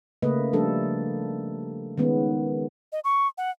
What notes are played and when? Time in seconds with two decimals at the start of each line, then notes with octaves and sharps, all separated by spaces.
0.22 C#3 A3 A#3 B4 D#5
0.53 F3 G3 A3 D4 A4
1.98 D#3 G#3 B3 C#4
2.92 D#5
3.04 C#6
3.38 F#5